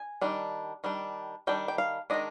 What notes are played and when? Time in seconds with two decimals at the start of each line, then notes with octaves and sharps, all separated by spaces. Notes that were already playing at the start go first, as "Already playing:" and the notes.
Already playing: G#5
0.21 D#3 G3 D4
0.84 D#3 G3 D4
1.47 D#3 G3 D4 G5
1.68 G5
1.78 F5
2.10 D#3 G#3 D4 D#5